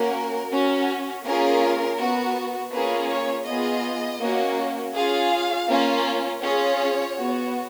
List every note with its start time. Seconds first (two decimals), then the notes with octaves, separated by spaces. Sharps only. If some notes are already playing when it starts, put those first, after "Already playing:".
Already playing: A#3 C#4 F#4 A#4
0.52 C#4 F#4
1.25 A#3 C#4 F4 G#4 A#4
1.98 B3 F#4
2.72 A#3 C#4 F4 G#4 B4
3.09 C#5
3.46 B3 F4 G#4 D#5
4.20 A#3 C#4 F#4
4.93 C#4 F4 G#4 F5
5.68 A#3 C#4 F4
6.41 C#4 F4 G#4 C#5
7.16 B3 F#4